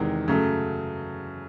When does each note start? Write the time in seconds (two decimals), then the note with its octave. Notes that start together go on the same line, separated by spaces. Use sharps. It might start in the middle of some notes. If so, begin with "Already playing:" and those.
Already playing: E2 C3 D#3 G#3
0.28 F#2 C#3 F#3 A3